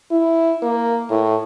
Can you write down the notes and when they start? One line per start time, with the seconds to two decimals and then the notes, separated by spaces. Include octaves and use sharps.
0.11 E4
0.63 A#3
1.10 A2